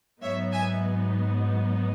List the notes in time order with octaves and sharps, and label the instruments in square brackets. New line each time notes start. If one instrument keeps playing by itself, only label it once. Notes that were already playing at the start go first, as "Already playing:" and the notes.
[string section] G#2 F#3 B3 D#4 C#5 E5
E5 G#5